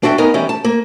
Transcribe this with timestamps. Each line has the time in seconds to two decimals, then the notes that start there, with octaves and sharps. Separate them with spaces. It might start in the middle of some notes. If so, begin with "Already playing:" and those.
0.03 D4 F#4 E5 G5
0.18 B3 D#4 A#4 D#5 G#5
0.34 E3 G3 C#4
0.49 A5
0.64 A#3